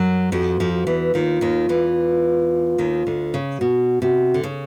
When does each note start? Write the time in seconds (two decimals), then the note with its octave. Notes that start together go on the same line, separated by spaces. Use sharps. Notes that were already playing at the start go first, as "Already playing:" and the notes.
Already playing: F#2 F#3
0.32 F2 F3 F#4
0.60 F2 F3
0.73 F#4
0.87 E2 E3
1.14 D#2 D#3 F4
1.41 D#2 D#3
1.69 E2 E3
2.78 D#2 D#3
3.07 D2 D3
3.34 C#3
3.60 B2 F#4
4.02 C3 F#4
4.34 D3
4.44 C#3